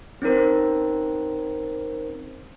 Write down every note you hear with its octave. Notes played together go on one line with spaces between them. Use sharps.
C4 C#4 D#4 A#4 C5